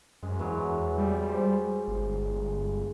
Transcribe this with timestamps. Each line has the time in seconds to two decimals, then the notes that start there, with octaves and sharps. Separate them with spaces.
0.23 F#2 G#3
0.39 E2 E3 F#3 G#3
0.98 G3
1.30 C5
1.88 G1